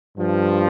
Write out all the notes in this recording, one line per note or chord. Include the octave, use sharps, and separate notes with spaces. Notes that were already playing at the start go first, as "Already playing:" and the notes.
G2 F3